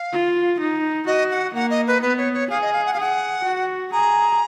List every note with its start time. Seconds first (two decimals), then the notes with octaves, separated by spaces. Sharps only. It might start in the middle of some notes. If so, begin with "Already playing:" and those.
Already playing: F5
0.12 F4
0.60 D#4
1.07 F#4 D#5
1.31 F#5
1.54 A#3 F#5
1.70 D#5
1.87 B4
2.02 B3 B4
2.17 C#5
2.33 C#5
2.50 G#4 F5
2.62 D#5
2.73 F5
2.86 F#5
2.93 F5
2.96 G#4 F#5
3.44 F#4
3.92 G#4 A#5